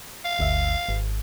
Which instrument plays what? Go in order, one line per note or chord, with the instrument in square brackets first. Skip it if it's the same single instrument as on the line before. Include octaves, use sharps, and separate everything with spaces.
[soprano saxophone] F5
[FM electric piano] G1 D2 E5
G#1